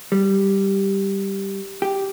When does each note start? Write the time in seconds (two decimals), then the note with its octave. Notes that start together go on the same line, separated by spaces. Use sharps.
0.12 G3
1.82 G4